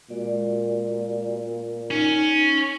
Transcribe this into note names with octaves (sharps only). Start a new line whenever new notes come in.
A#2 G#3 F#4 D5
C#4 D#4